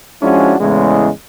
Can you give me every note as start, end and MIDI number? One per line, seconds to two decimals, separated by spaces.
0.21 0.53 53
0.21 0.53 56
0.21 0.53 61
0.21 0.53 62
0.21 0.53 64
0.21 0.53 66
0.59 1.08 40
0.59 1.08 45
0.59 1.08 49
0.59 1.08 56